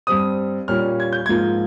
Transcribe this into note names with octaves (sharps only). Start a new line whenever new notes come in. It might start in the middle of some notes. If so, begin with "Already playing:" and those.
G2 G3 C4 D#6
A#2 G3 A#3 C#4 F6
G#6
G6
G#2 F3 A#3 F4 G#6